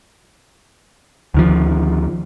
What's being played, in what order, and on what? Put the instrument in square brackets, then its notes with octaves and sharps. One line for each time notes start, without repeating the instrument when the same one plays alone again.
[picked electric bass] D2 D#3 F3